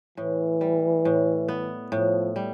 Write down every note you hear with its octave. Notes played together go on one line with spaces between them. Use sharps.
A2 E3
G3
A2
B3
A2 F3
G3